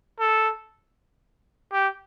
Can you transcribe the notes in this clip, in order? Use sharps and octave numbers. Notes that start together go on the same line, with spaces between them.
A4
G4